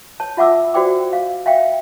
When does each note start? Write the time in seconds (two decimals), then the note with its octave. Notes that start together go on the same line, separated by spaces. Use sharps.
0.20 C#5 A5
0.37 F4 E5 F#5 D6 E6
0.74 F#4 C5 D5 G5 D6
1.13 F5
1.46 E5 F5 G5